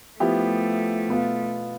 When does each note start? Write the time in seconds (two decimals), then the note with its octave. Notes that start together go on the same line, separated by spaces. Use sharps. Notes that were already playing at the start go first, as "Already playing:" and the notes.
0.20 F3 A3 B3 E4 G4
1.09 B2 B3 F4